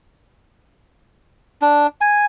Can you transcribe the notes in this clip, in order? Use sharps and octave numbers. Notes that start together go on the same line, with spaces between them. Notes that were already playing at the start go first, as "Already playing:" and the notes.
D4
G#5